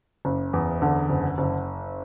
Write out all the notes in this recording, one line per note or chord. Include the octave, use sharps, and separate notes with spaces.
F#1
E2
D3
F#1
F#1